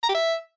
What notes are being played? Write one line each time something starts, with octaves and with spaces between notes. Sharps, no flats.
A#5
G4
E5